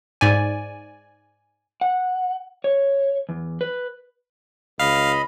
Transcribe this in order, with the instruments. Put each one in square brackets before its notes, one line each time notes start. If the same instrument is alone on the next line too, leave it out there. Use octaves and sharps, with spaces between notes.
[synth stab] G#2 D5 G#5
[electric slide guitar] F#5
C#5
E2
B4
[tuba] C#2 [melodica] D#5 B5 [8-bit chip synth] F5